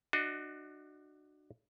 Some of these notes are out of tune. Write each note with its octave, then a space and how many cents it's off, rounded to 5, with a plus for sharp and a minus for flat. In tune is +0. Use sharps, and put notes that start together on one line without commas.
D4 +30 F#4 +0 D#5 +30